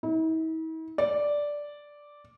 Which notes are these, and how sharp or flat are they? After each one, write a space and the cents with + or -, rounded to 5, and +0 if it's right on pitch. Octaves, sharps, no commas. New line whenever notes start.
E4 -45
D5 -5